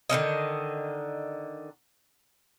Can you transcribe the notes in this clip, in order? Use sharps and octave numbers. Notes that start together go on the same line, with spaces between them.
D3 D#3 C#4 D#5